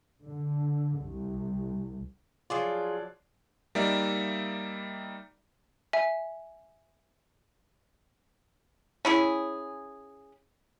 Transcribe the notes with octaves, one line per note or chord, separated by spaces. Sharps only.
D3
C2
F3 F#3 F4 G#4 D5
G3 A#3 D#4 D5 E5
E5 G#5
C#4 E4 G#4